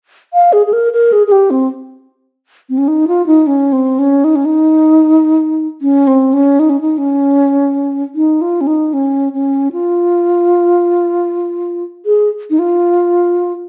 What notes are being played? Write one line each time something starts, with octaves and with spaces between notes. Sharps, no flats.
F5
G#4
G#4
A#4
A#4
G#4
G#4
G4
C4
C4
C#4
D#4
F4
D#4
C#4
C4
C#4
D#4
C#4
D#4
C#4
C4
C#4
D#4
C#4
D#4
C#4
D#4
F4
C#4
D#4
C#4
C#4
F4
G#4
D#4
F4